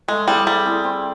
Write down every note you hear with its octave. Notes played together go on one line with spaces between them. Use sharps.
G#3 A3
G3 C4 E4 G#4
G3 A3
C4 E4 G#4
C4